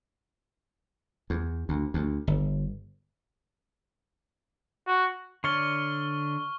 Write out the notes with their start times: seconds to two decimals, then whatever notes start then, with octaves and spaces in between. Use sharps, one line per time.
1.30 E2
1.69 D2
1.94 D2
2.27 G1
4.87 F#4
5.44 D3 C#5 D5 C#6 F6 G7